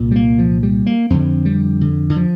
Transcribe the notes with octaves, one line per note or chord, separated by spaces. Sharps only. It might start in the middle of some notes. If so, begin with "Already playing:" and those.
Already playing: C2 A#2
G3
A#3
F3
G3
A#3
F2 D3 C4
G3
D3
D3
F3